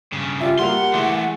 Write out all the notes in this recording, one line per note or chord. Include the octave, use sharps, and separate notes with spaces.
G2 C#3
F4 G4 D5 E5
G3 A#3 F#5 C6 F7
E3 A3 E4 G4 G#4